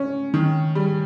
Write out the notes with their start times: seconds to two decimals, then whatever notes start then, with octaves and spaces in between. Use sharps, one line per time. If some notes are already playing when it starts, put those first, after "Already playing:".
Already playing: C#4
0.34 D#3
0.75 G3